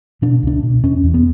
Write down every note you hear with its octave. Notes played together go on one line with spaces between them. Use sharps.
B2 D4
C#2 D4
B2
E2 C#4
E2
B3